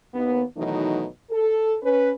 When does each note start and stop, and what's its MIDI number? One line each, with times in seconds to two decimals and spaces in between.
0.13 0.42 39
0.13 0.42 59
0.56 1.05 47
0.56 1.05 51
0.56 1.05 52
0.56 1.05 54
0.56 1.05 57
0.56 1.05 63
1.30 1.77 69
1.82 2.11 61
1.82 2.11 71